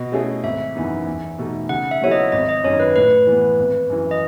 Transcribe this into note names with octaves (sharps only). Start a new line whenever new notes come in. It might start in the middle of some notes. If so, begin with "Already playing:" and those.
Already playing: B2 D#5
A3 C#4 E4 G#4
G#1 E5
F#2 E3 B3 D#4
E2
B2 A3 D#4
C#3 F#5
E5
F#3 B3 E4 A4 C#5
D#5
G#1 D#5
D#5
F#2 D#3 C#5
B4
A2 B4
E3 B3
G#1
F#2 E3
D#5